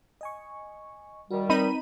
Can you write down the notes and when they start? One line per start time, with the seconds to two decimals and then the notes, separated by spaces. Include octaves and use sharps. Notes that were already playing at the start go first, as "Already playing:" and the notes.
0.21 D#5 G#5 C#6
1.31 D#3 G3 F#4
1.49 C4 D#4 B4 B5 D#7